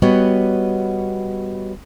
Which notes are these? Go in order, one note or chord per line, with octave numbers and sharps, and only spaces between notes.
G3 B3 F#4 C#5 D#5